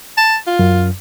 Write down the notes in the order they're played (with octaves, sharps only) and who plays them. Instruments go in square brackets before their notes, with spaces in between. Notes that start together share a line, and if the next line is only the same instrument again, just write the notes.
[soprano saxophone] A5
F4
[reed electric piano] F#2